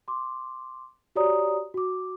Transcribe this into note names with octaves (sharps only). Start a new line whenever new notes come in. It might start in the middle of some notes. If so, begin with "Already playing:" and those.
C6 D6
F#4 G4 C#5 D5 A#5 D#6
F#4 D6